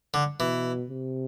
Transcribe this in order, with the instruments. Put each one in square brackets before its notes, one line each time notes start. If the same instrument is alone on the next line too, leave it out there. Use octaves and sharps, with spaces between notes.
[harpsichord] D3
[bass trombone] B2 [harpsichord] E3
[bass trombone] C3